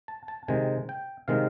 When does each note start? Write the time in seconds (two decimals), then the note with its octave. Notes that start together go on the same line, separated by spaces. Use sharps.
0.08 A5
0.28 A5
0.48 C3 D#3 G#3 G#5
0.89 G5
1.28 C3 D#3 G#3 F5